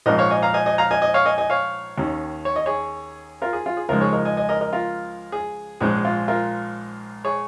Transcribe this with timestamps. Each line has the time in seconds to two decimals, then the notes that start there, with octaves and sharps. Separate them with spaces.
0.06 A#1 G#2 F3 C#4 A#4 D#5
0.18 C#5 F5
0.30 D#5 G#5
0.42 F5 A#5
0.54 D#5 G#5
0.66 D#5 G#5
0.78 F5 A#5
0.91 D#5 G#5
1.02 D#5 G#5
1.14 C#5 F5
1.25 D#5 G#5
1.38 D#5 G#5
1.50 C#5 F5
1.98 D#2 D#3 C#4
2.45 C#5
2.56 D#5
2.66 G#4 C#5
3.42 F4 A#4
3.53 G#4
3.66 F4
3.77 G#4
3.89 C#2 C#3 F3 G#3 D#4 F4 A#4
4.01 G#4 C#5
4.13 A#4 D#5
4.25 D#5 G#5
4.37 D#5 G#5
4.49 A#4 D#5
4.61 A#4 D#5
4.73 F4 A#4
5.32 G#4
5.80 A#1 G#2 G#3 C#4 G#4
6.05 F4
6.28 F4 A#4
7.25 G#4 C#5